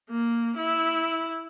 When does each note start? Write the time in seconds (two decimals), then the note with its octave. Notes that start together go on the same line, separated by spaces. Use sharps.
0.10 A#3
0.57 E4